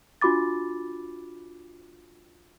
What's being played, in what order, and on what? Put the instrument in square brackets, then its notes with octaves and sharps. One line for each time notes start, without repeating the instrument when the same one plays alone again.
[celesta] D4 F4 F#4 B5 D6 A6